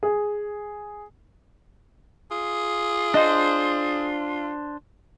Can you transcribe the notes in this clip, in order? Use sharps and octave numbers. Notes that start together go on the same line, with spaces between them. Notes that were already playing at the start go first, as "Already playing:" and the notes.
G#4
F4 G#4
D4 C5 D#5 F#5